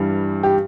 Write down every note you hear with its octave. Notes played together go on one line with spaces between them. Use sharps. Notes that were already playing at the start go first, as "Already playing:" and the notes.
Already playing: G2 E3 G3
G4